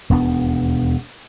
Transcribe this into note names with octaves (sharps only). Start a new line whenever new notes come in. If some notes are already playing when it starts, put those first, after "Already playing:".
E1 D#2 B3 D4